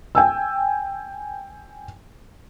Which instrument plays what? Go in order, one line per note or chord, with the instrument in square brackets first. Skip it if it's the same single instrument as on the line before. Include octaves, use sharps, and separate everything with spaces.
[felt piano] G5 G#5 E6